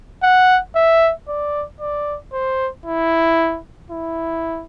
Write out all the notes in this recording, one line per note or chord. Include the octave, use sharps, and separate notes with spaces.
F#5
E5
D5
D5
C5
E4
E4